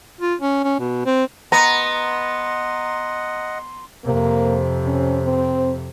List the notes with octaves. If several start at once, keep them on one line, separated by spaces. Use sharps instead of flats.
F4
C#4
C#4
B2
C4
B3 D#5 F#5 A#5 C6
F2 C3 A#3
C#4
C4